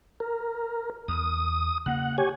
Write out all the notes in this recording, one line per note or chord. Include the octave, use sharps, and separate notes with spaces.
A#4
E2 D#6
C#3 A#3 F#5
G4 C#5 G#5